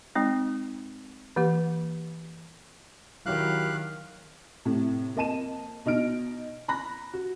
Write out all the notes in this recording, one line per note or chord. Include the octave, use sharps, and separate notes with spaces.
G#3 C4 D#4
E3 A#3 G4
D#3 F#3 E4 G4 F5 F#6
A2 C3
F2 A#3 D#5 A5 D#7 E7
B2 D#4 F6 D7
A#5 B5 F#6 A#6
F#4